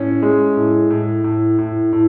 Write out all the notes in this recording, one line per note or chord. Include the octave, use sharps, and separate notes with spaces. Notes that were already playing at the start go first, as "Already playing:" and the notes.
Already playing: A2 C#4
G#3
A2
A2
A2
A2
A2